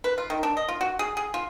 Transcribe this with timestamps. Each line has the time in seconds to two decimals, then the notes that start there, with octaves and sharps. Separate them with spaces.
0.04 B4
0.18 F4
0.30 D#3
0.43 D4
0.57 D#5
0.68 F4
0.81 F#4
0.99 G#4
1.17 G#4
1.34 F4